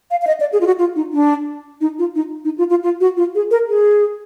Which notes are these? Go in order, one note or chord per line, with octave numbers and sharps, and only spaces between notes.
F5
F5
D#5
D5
G#4
F4
F#4
F4
D#4
D4
D#4
F4
D#4
D#4
F4
F4
F4
F#4
F4
G#4
A#4
G#4